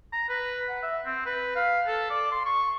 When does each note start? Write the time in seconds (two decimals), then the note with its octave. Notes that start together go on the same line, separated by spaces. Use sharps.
0.12 A#5
0.29 B4
0.69 F#5
0.83 E5
1.05 C4
1.26 B4
1.56 F5
1.87 A4
2.10 D5
2.32 C6
2.45 C#6